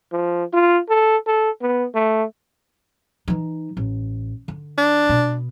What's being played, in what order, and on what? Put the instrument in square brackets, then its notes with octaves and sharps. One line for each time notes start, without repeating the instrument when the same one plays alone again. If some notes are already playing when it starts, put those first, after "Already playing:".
[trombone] F3
F4
A4
A4
B3
A3
[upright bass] E3 D#4
A1
D3
[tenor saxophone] D4
[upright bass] B2 B3